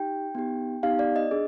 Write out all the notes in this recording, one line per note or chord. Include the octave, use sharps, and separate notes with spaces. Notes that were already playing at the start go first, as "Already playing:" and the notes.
Already playing: D#4 G4 G5
B3 D#4 G4
B3 D#4 G4 F5
D5
D#5
D4 G#4